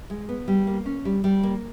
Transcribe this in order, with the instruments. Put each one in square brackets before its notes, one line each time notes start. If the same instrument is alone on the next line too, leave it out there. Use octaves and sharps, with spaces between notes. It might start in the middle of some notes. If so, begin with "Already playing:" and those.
[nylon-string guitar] G#3
B3
G3
A#3
C#4
G3
G3
A#3